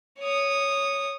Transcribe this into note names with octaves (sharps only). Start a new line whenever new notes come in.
C#5 D#6